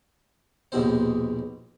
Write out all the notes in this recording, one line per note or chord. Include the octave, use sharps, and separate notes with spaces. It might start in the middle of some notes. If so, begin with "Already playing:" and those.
A#1 D#2 G#2 B2 C4 C5